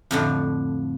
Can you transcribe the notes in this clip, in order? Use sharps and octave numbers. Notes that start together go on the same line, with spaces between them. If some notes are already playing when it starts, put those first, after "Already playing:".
F2 A2 D3